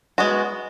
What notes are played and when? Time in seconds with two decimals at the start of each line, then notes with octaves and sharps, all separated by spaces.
0.18 G#3 B3 F#4